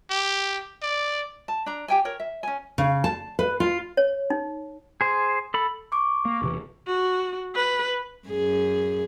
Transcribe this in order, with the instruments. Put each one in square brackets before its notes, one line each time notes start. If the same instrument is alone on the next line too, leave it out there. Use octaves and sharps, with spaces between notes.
[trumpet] G4
D5
[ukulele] A5
D4 A#5
G4 G5 G#5
A#4 C#5
E5
C#4 G#5
[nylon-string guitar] C#3
A5
B4
F4
[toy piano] C#5
D#4
[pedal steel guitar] G#4 C5
A4 B5
[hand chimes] C#6 D6
[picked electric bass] A#3
E1 C3 E3
[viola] F#4
B4
[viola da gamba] F#2 G#4